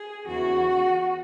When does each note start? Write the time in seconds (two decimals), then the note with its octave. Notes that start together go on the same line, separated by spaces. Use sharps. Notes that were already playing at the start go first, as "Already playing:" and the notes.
Already playing: G#4
0.26 E2 C#3 E3 F#4